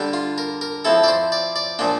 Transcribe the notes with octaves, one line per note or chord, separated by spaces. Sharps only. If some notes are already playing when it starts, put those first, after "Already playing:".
Already playing: D3 G3 D4
F4
A#4
A#4
F3 C4 E4 A4
D5
C5
D5
D5
A#2 F3 A#3 D4